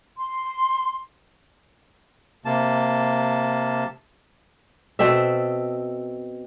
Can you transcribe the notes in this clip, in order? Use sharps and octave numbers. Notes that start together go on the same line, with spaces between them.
C6
C3 A#3 A5
B2 C4 A4 E5